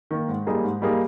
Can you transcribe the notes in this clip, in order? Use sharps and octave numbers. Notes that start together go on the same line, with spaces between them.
D#3 A#3
G#2
G3 A#3 D#4 G#4
G#2
G3 A#3 D#4 G#4